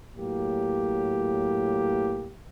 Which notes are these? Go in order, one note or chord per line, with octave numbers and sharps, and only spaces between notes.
A2 F#3 A#3 G4